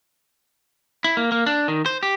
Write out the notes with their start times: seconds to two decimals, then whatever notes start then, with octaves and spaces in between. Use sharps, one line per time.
1.04 E4
1.17 A#3
1.32 A#3
1.46 D4
1.68 D#3
1.86 C5
2.03 G4